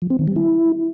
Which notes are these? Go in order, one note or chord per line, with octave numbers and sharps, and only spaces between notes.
F3
C4
D#3
G3
E4